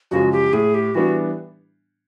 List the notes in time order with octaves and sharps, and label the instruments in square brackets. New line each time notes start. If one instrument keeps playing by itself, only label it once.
[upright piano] F#2 C#3 F3 G#3 [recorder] F#4
[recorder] G4
[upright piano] A2 [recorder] G#4
[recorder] G4
[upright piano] E3 G3 B3 D4 [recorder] F#4